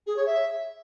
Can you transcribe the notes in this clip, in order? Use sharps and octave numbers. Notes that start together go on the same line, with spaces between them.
G#4
C#5
E5